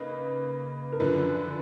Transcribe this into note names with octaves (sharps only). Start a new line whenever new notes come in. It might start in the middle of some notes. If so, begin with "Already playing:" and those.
Already playing: C#3 A#3 D#4 B4
A#4
F#2 D3 F3 B4